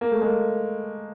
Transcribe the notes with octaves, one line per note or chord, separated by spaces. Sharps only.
A#3
A3
G#3 A#3